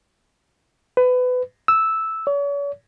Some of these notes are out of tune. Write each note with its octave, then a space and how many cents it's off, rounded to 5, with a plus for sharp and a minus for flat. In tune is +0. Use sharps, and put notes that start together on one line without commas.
B4 +25
E6 -5
C#5 +40